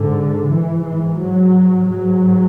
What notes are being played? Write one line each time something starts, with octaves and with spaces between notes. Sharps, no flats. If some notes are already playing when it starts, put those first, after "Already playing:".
Already playing: G#2 D3
G#2 E3
E3
F#3
G#2 F#3